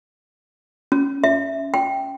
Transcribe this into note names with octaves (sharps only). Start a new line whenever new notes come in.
C#4
E5
G5